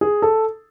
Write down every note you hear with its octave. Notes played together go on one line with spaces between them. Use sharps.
G#4
A4